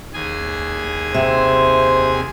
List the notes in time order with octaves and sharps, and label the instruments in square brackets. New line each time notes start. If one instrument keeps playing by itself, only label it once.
[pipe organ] D#2 G#4 G#5
[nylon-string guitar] C3 [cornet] C5 [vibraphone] E5